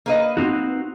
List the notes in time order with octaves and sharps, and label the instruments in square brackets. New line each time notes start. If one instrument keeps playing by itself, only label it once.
[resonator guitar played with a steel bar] A#3 B4 D#5
[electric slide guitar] C4 D#4 F#4